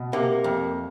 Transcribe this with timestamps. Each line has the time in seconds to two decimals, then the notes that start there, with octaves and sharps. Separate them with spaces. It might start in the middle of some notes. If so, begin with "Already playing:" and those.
Already playing: B2
0.13 C3 A#3
0.44 F2